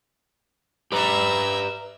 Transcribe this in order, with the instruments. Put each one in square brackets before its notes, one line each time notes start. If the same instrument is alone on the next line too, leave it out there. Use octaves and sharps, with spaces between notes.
[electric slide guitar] G4 B4 [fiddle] E5 A#5